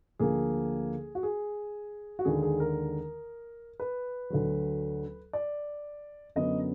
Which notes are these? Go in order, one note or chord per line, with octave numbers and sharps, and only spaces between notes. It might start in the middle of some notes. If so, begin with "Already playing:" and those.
D2 D3 F3 A#3 G#4
F#4
G#4
F#4
D#2 D3 G#3 G#4
G#4
A#4
B4
D2 D3 F#3
D5
F#2 D3 F#3 B3 D#5